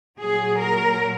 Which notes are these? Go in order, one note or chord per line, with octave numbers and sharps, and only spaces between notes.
A#2 F#3 G#4
A#4